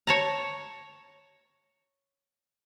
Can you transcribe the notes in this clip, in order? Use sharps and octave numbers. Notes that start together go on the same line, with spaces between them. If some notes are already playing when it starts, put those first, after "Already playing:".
C#5 A5 A#5